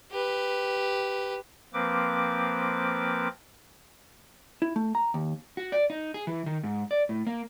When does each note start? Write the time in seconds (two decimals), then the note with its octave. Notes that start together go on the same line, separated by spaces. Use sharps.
0.11 G4 B4
1.73 F3 A#3 C4 B4 D6
4.62 E4
4.76 A3
4.95 A#5
5.14 D#2
5.57 F#4
5.72 D5
5.90 D#4
6.14 G#4
6.27 E3
6.46 D#3
6.63 G#2
6.91 D5
7.09 A2
7.27 A#3